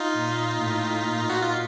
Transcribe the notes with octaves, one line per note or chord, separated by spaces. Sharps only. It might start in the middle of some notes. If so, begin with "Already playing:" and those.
Already playing: D#4 F4
A#2
A2
A#2
F#4
F4